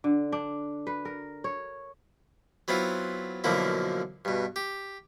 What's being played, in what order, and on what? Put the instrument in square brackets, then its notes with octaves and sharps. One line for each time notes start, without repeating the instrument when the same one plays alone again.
[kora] D3
D4
B4
A#4
C#5
[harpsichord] F#3 B3 C4 E4 F4
F#2 B2 D3 F3 A#3 E4
G2 B2
G4